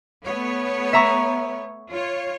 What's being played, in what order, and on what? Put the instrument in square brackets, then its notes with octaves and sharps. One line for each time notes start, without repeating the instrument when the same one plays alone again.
[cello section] A3 B3 C#5
[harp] E5 A#5 C#6
[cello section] F4 C#5